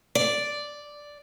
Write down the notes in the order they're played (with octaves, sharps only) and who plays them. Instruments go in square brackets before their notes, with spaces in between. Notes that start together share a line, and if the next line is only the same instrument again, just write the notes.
[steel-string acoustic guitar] D5